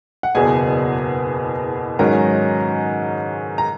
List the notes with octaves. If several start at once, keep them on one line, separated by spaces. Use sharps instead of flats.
F#5
F#1 E2 B2 G#4 G#5
G#2 D#3 F#3 C#4 A#4 A#5
A#5